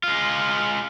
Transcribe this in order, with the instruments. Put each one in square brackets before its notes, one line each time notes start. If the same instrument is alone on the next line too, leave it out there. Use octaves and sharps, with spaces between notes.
[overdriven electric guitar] G#3 F4